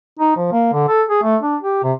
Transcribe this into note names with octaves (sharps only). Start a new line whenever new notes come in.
D#4
F3
A#3
D3
A4
G#4
A3
D4
G4
C3